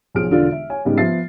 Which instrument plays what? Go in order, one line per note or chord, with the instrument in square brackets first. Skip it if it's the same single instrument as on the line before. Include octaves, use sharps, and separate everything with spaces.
[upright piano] B1 F3 G#4 F6 D7
E1 D3 F4 D5
E5
C#5 G#5
G#2 C#3 G3 B3 D#4
F3 B3 E5 A6 C7